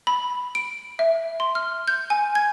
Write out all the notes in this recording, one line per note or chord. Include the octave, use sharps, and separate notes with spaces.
B5
D7
E5
C6
F6
G6
G#5
G#6